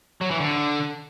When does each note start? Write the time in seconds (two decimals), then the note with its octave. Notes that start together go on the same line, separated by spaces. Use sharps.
0.21 F#3
0.31 E3
0.40 D3